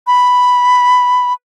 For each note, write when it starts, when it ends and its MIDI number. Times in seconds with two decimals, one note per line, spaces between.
0.07 1.33 83